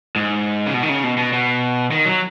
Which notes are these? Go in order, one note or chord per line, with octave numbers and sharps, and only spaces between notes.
G#2
C#3
B2
D#3
C#3
B2
B2
B2
D#3
F#3